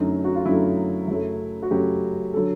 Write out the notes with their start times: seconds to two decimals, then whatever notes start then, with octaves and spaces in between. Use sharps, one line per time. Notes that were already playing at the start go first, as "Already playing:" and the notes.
Already playing: F#2 D3 F#3 A3 D#4
0.24 F#4
0.35 F4
0.45 F#2 D3 F#3 A3 E4
1.08 F#2 C#3 F#3 A3
1.63 F#4
1.71 F#2 C#3 F#3 A3 G4
2.34 D3 F#3 A4